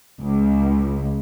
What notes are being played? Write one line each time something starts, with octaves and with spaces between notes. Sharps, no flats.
C#2